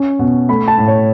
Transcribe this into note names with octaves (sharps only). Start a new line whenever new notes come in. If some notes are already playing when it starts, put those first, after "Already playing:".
Already playing: C#4
B2
A3 B5
A5
A2
C#5